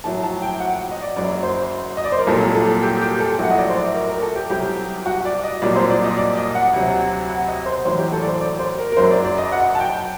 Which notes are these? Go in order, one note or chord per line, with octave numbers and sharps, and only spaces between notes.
A#1 A2 F#3 A5
A5
G5
F#5
F#5
D#5
D5
F#1 F#2 F#3 D5
C5
D#5
D5
C5
A#4
C2 A#2 F#3 A4
A4
G4
G4
A4
A#1 A2 F#3 F#5
D#5
D5
C5
D5
A#4
A#4
A4
G4
C2 C3 F#3 G4
F#4
D5
D#5
C2 A#2 F#3 D5
C5
D5
D#5
D5
D#5
F#5
D2 C3 F#3
F#5
D#5
C5
A1 A2 F#3 C5
G4
A4
D5
C5
D5
C5
A#4
A#4
F#1 F#2 F#3 C5
D5
D5
D#5
F#5
A5
G5